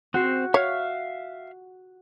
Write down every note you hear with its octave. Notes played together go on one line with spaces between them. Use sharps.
C4 F#4 C5
C#5 E5 F5 F6